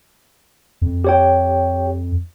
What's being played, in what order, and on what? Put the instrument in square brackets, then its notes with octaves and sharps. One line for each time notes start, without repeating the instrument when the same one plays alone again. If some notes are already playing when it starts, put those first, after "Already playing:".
[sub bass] F2
[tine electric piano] G4 C#5 G5